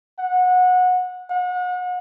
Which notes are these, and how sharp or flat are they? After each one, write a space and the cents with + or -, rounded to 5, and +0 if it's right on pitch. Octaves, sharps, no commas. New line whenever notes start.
F#5 -20
F#5 -35